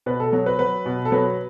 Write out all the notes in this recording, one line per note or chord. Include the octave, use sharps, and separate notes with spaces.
B2 B4
A4
F#3
B4
F#3 B4
B2
A4
F#3 B4